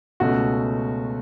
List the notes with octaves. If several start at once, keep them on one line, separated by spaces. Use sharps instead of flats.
C#2 B2 A3 F#4